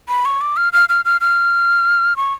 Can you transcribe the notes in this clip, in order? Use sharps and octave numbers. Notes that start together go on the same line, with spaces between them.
B5
C#6
D6
F6
F6
F6
F6
F6
C#6